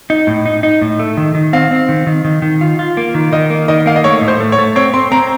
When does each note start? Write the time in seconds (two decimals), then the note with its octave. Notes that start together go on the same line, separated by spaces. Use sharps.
0.10 D#4
0.27 A2
0.46 D#4
0.63 D#4
0.81 A2
0.99 A3
1.17 D#3
1.35 D#3
1.53 C4 F5
1.71 C4
1.89 D#3
2.07 D#3
2.25 D#3
2.42 D#3
2.61 F4
2.79 F4
2.97 A#3
3.15 D#3
3.33 D#3 D#5
3.50 A#3
3.68 D#3 D#5
3.86 A#3 F5
3.96 D#5
4.04 A3 C#5
4.22 A2
4.28 C5
4.40 A3
4.52 C#5
4.59 A3
4.76 C4 C#5
4.94 C4 C6
5.12 C4 A#5